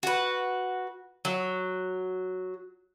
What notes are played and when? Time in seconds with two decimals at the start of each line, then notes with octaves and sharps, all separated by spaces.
0.03 F#4 B4
1.25 F#3